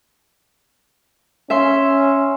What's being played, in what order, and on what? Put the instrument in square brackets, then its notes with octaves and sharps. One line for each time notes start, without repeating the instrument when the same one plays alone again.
[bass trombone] C#4 [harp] E5 C6